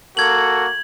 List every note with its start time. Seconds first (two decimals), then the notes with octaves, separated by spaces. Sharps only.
0.17 A#3 F#4 A4 G#6 F#7